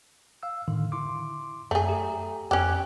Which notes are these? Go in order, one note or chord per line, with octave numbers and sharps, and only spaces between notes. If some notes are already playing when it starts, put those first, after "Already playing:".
F5 E6
A2 D3 D#3
E4 C6 D6
F#2 A3 G#4
G4 A#5
F2 C#4 G4 F#6